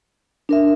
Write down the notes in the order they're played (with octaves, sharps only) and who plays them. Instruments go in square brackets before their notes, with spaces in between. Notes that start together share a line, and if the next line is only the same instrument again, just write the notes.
[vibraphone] D4 A#4 E5